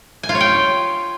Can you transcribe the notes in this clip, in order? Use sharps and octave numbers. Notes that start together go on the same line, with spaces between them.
G#5
F4
C#5
G5